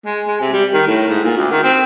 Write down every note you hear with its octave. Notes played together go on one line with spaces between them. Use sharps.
G#3
G#3
C3
G3
D#3
A2
G#2
A#2
D2
D#3
C4